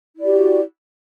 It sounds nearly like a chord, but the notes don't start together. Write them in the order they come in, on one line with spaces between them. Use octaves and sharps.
E4 D5 G4 F#4